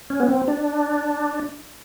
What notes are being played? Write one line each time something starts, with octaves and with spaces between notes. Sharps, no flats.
C#4
B3
C4
D4